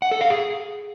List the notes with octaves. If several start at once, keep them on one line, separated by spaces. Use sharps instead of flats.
F#5
A4
F5
G#4